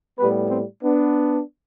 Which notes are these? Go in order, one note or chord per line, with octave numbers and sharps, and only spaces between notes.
A2 G3 B3 G4 B4
C4
B3 D4